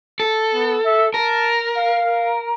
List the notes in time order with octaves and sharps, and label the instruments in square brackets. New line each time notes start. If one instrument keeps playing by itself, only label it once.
[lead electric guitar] A4
[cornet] B3
E5
[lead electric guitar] A#4 [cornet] A5
[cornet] F5